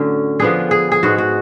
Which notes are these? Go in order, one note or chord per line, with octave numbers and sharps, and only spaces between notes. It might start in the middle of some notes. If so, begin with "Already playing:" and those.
Already playing: A2 D3 F#3 C#4
F3 B3 D4 G#4
G#4
G#4
G#2 G#3 B3 F#4
F#4